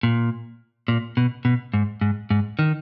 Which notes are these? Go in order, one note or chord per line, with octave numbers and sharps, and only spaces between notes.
A#2
A#2
B2
B2
G#2
G#2
G#2
D#3